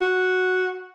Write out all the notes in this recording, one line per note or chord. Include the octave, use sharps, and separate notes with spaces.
F#4